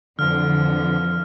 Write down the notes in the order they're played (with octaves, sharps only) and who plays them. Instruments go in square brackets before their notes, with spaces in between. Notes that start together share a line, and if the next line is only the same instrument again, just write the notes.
[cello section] F2 E3 F3 [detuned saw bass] D3 [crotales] F6